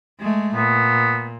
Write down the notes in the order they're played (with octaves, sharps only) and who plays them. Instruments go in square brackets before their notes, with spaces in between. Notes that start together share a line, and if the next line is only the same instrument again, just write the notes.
[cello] G#3 A3
[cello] A#2 [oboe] B3